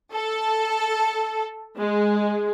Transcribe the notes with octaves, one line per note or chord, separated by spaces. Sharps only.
A4
G#3